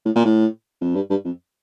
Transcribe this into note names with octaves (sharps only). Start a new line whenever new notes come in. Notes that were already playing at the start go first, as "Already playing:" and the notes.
A2
A#2
A2
F2
G2
G2
F2